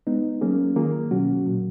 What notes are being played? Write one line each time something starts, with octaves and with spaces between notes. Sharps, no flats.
G#3 B3 D#4
F#3 A#3 C#4 G#4
D#3 A#3 F4 G#4
B2 F#3 C#4 F#4
A#2 F#3 A#3